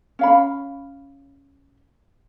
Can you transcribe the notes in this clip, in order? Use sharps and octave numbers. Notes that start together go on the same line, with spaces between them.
C#4 F5 B5